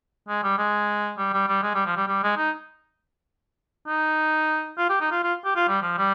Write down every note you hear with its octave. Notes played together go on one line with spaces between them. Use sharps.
G#3
G3
G#3
G3
G3
G3
G#3
G3
F3
G3
G3
G#3
D#4
D#4
F4
G4
D#4
F4
F4
G4
F4
G3
F3
G3